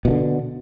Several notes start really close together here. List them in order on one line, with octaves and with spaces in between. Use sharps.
B2 E3 D3